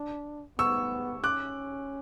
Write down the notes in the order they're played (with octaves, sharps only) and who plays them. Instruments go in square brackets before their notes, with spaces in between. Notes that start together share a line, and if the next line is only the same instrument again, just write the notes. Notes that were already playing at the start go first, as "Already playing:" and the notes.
Already playing: [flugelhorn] D4
[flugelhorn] B3 [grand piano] C#6 E6
[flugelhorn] C#4 [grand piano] D6 F#6